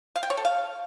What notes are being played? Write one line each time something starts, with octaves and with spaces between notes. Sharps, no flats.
F5
G5
C#5
A4
F5